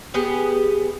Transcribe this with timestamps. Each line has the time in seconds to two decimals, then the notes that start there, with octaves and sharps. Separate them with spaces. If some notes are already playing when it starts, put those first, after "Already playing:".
0.14 B3 G4 G#4